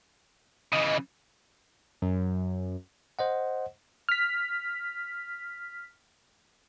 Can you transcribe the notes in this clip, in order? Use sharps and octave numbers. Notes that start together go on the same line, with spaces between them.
C#3 E3 D#5
F#2
C5 D#5 F#5
F6 B6